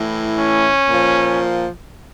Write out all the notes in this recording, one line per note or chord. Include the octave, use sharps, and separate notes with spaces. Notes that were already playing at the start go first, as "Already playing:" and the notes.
Already playing: A2 E3
C#4
A#2 F3